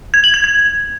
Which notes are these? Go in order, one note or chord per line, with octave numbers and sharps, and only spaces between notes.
G#6
F#7
G#6
G#6